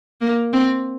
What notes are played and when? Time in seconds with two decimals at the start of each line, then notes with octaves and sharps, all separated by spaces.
0.21 A#3
0.53 C4